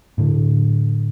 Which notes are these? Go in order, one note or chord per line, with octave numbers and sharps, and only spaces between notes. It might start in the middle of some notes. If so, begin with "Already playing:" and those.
A2 D3